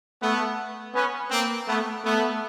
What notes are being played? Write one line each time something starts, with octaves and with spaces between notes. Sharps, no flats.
A3 B3
B3 C#4
A#3 C4
A3 B3
A3 B3